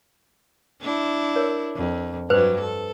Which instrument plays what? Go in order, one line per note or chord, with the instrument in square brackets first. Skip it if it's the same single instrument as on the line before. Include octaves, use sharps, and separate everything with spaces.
[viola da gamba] D4 E4
[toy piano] A#4 C#5
[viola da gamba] F2
[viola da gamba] G2 F#3 [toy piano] B4 C5
[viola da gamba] A4